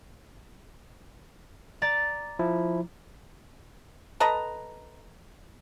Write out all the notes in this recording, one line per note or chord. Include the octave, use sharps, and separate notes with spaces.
D5 A#5 A6
F3 E4
A4 B4 D#5 A#5